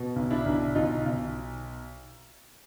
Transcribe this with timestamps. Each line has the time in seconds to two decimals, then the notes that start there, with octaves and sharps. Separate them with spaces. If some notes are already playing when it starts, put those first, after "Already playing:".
Already playing: B2
0.16 B1
0.30 D4 E4
0.46 B1
0.75 B1 D#4 F4
1.06 B1